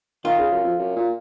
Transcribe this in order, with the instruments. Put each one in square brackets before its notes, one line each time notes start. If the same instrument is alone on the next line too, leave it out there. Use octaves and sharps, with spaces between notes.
[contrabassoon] D#3 [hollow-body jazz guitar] F4
[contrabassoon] C#3
F#2
F2
F#2
A#2